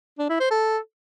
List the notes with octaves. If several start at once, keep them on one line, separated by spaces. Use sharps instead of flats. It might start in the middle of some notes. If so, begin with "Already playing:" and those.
D4
E4
C5
A4